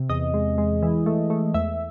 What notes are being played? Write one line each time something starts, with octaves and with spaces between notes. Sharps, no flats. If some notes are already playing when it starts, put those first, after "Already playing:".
Already playing: C3
E2 D#5
G#3
G#3
E3
A3
A3
E2 E5